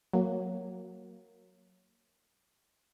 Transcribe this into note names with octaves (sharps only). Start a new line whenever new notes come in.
F#3 A#3